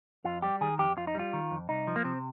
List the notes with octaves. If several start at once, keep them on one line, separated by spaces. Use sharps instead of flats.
F2 F4
G3 G4
D#3 G#4
F2 G4
F2 F4
D#4
G3 F4
D#3
F2
C2 D#4
F3
A#3
C3 C4